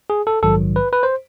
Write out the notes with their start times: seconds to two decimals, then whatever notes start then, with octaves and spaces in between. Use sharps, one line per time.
0.10 G#4
0.27 A4
0.43 A#1 G#2 D#3 F#3 A4
0.76 B4
0.93 B4
1.03 C5